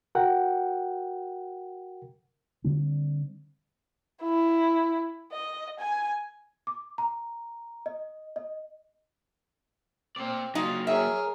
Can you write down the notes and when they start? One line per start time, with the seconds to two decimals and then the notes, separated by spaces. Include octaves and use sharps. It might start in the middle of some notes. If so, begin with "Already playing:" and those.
0.15 F#4 A#4 F#5 G5
2.64 D3 G3 C4 D4
4.22 E4
5.32 D#5
5.79 G#5
6.67 D6
6.98 A#5
7.86 D#5
8.36 D#5
10.16 A#3 C4 D5
10.55 F#3 A#3 D#4 F4
10.87 G#4 A#4 C#5 E5